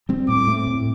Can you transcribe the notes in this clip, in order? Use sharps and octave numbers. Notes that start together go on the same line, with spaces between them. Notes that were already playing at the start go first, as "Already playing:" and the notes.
G3 C4
A2 D6
A3 C4
A2